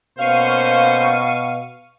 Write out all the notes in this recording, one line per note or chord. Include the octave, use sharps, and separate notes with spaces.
B2 A#3 C#4 C5 F5 C#6 D#7